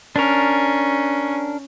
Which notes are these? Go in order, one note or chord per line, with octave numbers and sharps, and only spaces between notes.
C#4 D4 A#4